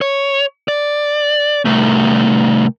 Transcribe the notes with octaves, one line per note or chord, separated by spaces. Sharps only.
C#5
D5
C2 A3